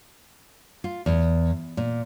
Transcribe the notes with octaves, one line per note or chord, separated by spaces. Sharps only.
F4
E2
A#2